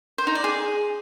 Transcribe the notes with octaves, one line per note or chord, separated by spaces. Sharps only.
C5
D#4
D5
G#4